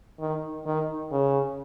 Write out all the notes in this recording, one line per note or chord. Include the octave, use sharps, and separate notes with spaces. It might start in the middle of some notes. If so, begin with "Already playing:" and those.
D#3
D#3
C#3